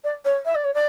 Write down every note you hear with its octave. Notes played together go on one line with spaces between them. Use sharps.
D5
C#5
E5
D5
C#5
D5